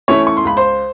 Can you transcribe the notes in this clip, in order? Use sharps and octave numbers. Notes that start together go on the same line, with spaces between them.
E3 A3 C#4 E4 C#5 C#6
C#6
C6
C#2 B5
C5 C6